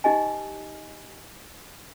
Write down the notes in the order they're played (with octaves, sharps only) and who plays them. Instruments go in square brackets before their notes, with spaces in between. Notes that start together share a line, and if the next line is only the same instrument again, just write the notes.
[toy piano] D#4 G4 D#5 G#5